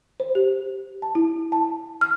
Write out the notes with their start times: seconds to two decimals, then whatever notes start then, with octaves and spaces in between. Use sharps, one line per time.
0.20 C5
0.35 G4
1.02 A5
1.15 E4
1.52 A5
2.01 F6